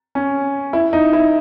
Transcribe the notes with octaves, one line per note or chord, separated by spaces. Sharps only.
C#4
E4
D#4
E4